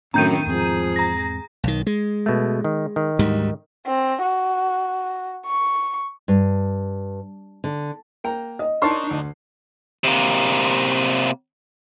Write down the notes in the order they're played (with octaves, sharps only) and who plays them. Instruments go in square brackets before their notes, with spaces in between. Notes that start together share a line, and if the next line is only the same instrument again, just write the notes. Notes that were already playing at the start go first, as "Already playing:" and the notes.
[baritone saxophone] F#2 [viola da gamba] A2 D#3 [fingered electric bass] C4 D4 [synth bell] A#5 G6 D#7
[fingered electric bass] E2 G#2 C4 [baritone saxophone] F3 [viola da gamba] G#4
[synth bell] A#5 A#6
[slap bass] B1 D#3
G#3
[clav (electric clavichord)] B2 A3
D#3
D#3
[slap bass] D2 G#2 G3
[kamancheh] C4
F#4
C#6
[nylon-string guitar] G2
D3
[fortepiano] A#3 G5 A#5
[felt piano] D#5
[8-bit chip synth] D4 D#4 [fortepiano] A#4 C#5 A5 [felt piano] C6 C#6 C7
[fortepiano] D2
[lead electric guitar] C3 A#3